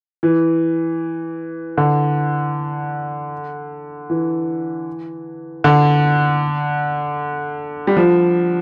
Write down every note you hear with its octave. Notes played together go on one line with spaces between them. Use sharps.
E3
D3
E3
D3
G3
F3